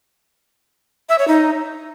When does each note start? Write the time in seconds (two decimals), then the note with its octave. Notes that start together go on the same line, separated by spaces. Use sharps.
1.09 E5
1.19 C#5
1.28 D#4